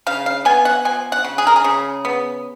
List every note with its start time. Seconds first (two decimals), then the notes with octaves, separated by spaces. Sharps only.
0.07 C#3 F5
0.26 F5
0.45 B3 G#5
0.65 F#5
0.85 F3 G#5
1.12 F#5
1.24 C#3
1.38 G#4
1.47 A#4
1.56 G#4
1.64 C#3
2.05 B3